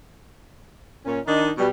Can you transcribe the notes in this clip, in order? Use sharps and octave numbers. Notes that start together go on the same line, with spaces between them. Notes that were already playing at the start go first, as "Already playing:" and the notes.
A#2 C#4
D#3 D4 D#4
B2 G3